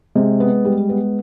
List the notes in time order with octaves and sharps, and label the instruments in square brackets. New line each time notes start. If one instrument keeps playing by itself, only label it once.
[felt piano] C3 [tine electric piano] G#3
[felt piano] B3
G3
B3